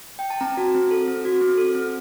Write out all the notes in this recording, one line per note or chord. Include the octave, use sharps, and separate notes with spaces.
G5
A5
C4 A#5
F#4
C4
A4
C4
F#4
C4
A4
C4